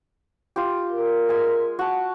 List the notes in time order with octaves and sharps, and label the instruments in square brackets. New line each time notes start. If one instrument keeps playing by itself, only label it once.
[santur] F4 G4
[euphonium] A#4
[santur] G#3 G#5
F#4 A5